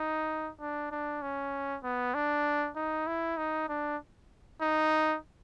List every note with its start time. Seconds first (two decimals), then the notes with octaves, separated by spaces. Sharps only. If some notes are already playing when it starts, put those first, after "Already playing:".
Already playing: D#4
0.61 D4
0.91 D4
1.22 C#4
1.84 B3
2.14 D4
2.76 D#4
3.07 E4
3.37 D#4
3.69 D4
4.62 D#4